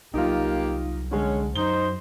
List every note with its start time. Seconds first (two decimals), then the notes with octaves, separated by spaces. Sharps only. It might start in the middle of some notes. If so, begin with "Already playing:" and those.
0.14 C2 F#3 A#3 D#4 F4 G4
1.11 D3 G#3 C#4
1.55 F#2 F#3 D#4 C5 G7